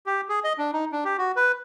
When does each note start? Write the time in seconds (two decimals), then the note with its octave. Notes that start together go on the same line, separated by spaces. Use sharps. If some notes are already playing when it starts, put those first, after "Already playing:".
0.06 G4
0.29 G#4
0.44 D#5
0.58 D4
0.73 D#4
0.92 D4
1.05 G4
1.18 F#4
1.36 B4